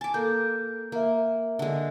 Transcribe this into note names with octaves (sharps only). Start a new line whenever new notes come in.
G#5 A5 D6
A#3 A4 G6
A#3 A#4 E5
D3 G#3